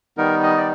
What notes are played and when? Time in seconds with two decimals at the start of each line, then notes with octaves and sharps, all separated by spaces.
0.17 D#3 G3 B3 D#4 A#4
0.43 D#5
0.57 D5